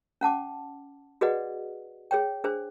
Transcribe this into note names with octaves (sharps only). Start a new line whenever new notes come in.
C#4 F#5 A5 D6
F#4 G#4 B4 D5 D#5 F#5
G#4 C#5 G5
D4 G#4 C5